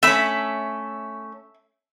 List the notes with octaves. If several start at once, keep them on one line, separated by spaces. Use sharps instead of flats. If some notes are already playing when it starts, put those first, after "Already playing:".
A3 C#4 E5 B5